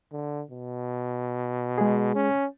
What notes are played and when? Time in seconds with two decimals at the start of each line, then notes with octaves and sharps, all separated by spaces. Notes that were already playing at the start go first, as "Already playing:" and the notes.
0.13 D3
0.51 B2
1.78 G#3 G#4
2.15 C#4